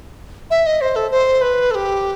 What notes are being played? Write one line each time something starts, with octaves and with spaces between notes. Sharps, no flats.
E5
D#5
C5
A4
C5
B4
A4
G4